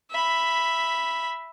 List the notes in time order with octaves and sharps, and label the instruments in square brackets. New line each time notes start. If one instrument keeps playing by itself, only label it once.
[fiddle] E5 B5